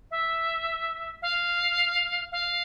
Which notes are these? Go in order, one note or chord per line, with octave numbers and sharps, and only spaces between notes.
E5
F5
F5